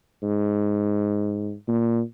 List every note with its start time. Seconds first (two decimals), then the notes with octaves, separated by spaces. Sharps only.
0.23 G#2
1.68 A#2